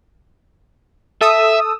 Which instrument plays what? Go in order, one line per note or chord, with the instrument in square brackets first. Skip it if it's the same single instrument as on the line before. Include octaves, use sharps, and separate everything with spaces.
[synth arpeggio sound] A4 D#6 E6 [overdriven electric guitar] E5